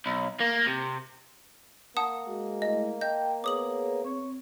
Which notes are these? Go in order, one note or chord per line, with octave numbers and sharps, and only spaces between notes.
B1
A#3
C3
A#3 F#5 A5 D#6
G#3 F#4
A3 E4 D#5
D#5 G5 A5 G6
B3 G#4 C#5 D6 D#6 F#7
C4 C#5